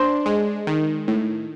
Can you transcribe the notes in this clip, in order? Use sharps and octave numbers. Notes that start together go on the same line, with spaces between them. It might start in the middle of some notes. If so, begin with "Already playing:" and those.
Already playing: D4 C5
G#3
D#3
A2